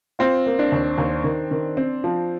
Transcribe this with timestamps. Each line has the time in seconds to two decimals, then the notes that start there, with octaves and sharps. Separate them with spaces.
0.19 C4 F4
0.46 A#3
0.59 D4
0.72 D#2
0.98 D#2
1.24 D#3
1.51 D#3
1.77 C4
2.04 F3